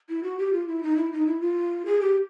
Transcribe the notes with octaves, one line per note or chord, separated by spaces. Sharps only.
E4
F#4
G4
F4
E4
D#4
E4
D#4
E4
F4
G#4
G4